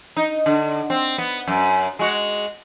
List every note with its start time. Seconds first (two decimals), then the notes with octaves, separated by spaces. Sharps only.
0.17 D#4
0.46 D3
0.90 C4
1.18 B3
1.47 F#2
1.99 G#3 F#4